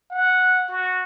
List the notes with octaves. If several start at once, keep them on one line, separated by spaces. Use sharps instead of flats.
F#5
F#4